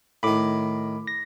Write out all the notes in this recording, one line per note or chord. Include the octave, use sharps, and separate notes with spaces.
A2 D#3 B5 D6
A#6